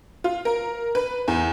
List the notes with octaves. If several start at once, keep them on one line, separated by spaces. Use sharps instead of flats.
F4
A#4
B4
E2